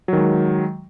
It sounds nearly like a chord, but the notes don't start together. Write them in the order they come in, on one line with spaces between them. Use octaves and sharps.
F#3 D#3 G#3